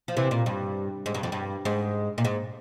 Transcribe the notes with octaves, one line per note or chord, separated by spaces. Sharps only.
F3
C3 E3
A#2
G2
G#2
G2
F2
G2
G#2
A#2
G#2